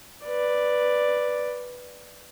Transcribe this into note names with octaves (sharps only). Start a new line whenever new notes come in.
B4 D5